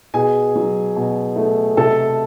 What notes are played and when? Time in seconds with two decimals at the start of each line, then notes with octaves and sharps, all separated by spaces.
0.14 B2 G#4 G#5
0.56 F#3
0.96 B2
1.36 A3
1.77 C3 A4 A5